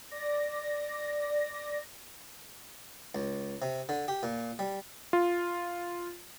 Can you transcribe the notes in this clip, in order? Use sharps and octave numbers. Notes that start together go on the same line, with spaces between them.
D5 A#6
C#2
C3
D3
G4
A#2
G3
F4